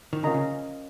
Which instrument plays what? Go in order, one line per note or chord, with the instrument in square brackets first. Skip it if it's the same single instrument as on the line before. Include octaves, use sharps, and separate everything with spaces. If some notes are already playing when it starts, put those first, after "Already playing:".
[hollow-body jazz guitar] D#3
[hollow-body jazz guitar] C#3 [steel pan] C#4 F4 A#4 D#5 A#5
[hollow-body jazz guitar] C#3